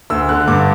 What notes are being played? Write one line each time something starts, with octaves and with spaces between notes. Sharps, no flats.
D2 E6
D3 F#6
G2 D6